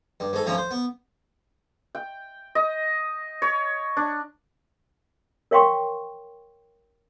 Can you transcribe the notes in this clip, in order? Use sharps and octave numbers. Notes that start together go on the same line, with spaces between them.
G2
G#2 A4
D2 F3 C#4 A#5
C5
B3
G5
D#5
C#5
D4
A#4 C#5 F5 G5 C6 C#6